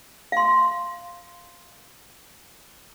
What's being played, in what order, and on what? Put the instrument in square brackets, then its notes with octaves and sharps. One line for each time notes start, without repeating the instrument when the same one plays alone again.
[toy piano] F5 C6